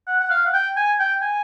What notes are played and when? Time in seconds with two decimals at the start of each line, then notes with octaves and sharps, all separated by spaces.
0.07 F#5
0.20 F#5
0.30 F5
0.46 F#5
0.54 G5
0.76 G#5
0.99 G5
1.22 G#5